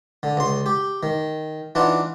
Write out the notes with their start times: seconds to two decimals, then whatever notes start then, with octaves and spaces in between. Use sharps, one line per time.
0.23 D3
0.37 C#2 C6
0.66 G4
1.03 D#3
1.75 E3 D4 D#4 F4 F#5